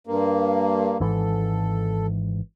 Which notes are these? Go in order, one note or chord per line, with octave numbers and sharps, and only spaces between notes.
G2 A#3
G#1 G#2 E3 A4